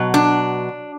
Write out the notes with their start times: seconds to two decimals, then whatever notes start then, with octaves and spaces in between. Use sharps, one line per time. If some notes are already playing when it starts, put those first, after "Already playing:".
Already playing: B2 F#3
0.14 D4